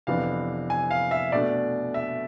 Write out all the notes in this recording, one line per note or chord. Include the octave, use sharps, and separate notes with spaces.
F2 C3 E3 B3 D4 F5
G#5
F5
E5
B2 A3 D4 D5
E5